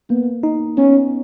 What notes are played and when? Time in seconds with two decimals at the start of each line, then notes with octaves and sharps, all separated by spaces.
0.10 A#3 B3
0.43 D#4
0.77 B3 C#4